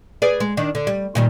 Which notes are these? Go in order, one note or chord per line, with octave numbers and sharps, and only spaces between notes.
G#4 B4 D5
G#3
D#3 D4
D3
G3
A#2 D#3 G3